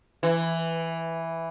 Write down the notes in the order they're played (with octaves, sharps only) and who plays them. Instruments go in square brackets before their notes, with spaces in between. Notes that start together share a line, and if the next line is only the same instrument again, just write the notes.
[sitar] E3